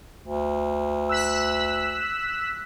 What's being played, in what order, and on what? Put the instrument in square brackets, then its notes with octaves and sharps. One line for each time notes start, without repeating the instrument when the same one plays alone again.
[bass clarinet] D2
[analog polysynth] E6 F#6 B6